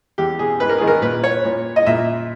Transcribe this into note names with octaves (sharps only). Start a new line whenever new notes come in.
E2 G4
B2 G#4
G#2 B4
A#4
D#3 G#4
A#4
A#2 B4
C#5
A#2
D#5
A#2 E5